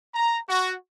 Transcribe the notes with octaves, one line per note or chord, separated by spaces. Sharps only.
A#5
F#4